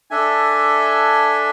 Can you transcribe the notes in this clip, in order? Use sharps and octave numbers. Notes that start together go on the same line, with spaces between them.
D4 A4 E5 G#5